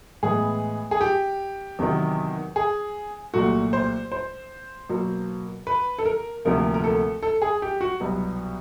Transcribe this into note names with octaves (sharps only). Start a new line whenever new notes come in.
A2 E3 G#3 B3 G#4
G#4
G4
E2 C3 D#3 F#3
G#4
C2 A#2 F#3 A3 F#4
C5
C5
B2 F#3 A#3
B4
A4
A#4
D2 C3 F3 A#3 A#4
A#4
A4
A4
G#4
G4
F#4
C2 B2 F#3 B3